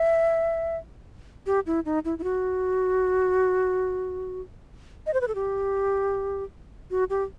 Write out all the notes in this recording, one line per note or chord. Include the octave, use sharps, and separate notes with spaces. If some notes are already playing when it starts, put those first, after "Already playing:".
Already playing: E5
G4
E4
D#4
E4
E4
F#4
D#5
C5
B4
A4
G4
F#4
G4